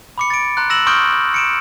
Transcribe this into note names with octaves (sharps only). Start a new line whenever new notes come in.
B5 D6 C#7
A6 D7
A#5 C6 F#6
E6 A#6 E7 F#7
C6 C#6 D#6 F6 G6 D7
C#7 D7 E7